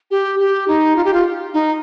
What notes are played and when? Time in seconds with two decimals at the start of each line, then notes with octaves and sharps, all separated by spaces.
0.11 G4
0.39 G4
0.68 D#4
0.96 F4
1.04 G4
1.14 F4
1.54 D#4